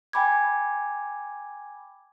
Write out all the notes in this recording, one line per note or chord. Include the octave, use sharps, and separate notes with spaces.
G5 G#5 B5 D6 G#6